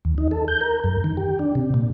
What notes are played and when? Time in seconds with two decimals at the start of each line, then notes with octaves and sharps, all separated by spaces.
0.05 D#2
0.18 D#4
0.31 A4
0.48 G6
0.61 A#4
0.84 F#2
1.04 D#3
1.17 G4
1.39 D4
1.55 C3
1.74 A#2